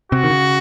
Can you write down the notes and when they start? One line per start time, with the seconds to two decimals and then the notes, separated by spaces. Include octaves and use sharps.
0.12 C3 F#4
0.24 D#3
0.30 C#3